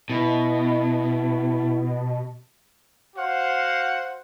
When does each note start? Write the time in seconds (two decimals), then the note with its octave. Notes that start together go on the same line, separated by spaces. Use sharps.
0.10 B2 E4
3.16 F#4 C5 F5 F#5